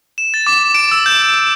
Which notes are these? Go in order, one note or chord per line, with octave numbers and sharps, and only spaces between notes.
E7
A6
D6
D7
E6
G6
G6